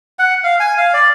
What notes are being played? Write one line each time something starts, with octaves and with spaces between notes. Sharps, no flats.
F#5
F5
G#5
F5
D5